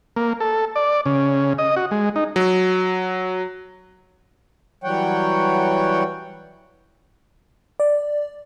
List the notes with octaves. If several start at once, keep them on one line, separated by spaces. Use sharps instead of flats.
A#3
A4
D5
C#3
D#5
F#4
G#3
D#4
F#3
E3 F#3 G3 C#5 F#5 G5
D5